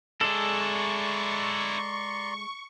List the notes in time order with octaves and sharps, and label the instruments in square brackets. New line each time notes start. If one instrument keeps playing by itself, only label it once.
[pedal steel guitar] G#3 A4 [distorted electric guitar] D4 E4 [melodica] D5 A#5 C6 [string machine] C#6